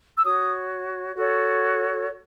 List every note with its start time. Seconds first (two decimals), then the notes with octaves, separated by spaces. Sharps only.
0.16 E6
0.24 F#4 C#5 D#6
1.15 F#4 A4 C#5